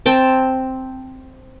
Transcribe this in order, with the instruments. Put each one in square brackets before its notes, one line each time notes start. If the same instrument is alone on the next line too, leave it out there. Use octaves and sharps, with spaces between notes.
[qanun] C4 G5 A5